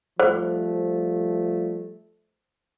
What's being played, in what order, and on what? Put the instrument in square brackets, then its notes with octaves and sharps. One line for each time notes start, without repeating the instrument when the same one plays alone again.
[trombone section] F3 G3 A3 [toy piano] C5